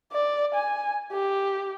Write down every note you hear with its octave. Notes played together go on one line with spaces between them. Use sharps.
D5
G#5
G4